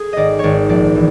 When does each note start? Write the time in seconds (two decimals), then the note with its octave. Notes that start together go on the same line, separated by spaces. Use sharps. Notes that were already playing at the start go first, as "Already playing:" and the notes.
Already playing: G#4
0.13 G#1 D5 D#5
0.39 G#1 C#5 D5
0.69 A#1 D5
0.95 E3